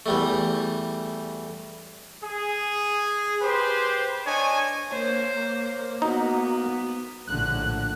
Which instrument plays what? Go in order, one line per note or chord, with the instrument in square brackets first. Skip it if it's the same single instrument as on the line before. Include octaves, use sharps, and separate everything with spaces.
[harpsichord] E2 G3 A3
[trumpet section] G#4
G4 B4 C5
D4 C#5 D#5 G#5
[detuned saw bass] A#3 [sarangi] C5 [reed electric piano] C#5
[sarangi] B3 [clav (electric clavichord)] D#4 [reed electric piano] F#4 A#5
[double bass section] A#1 A2 D3 [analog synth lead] F#6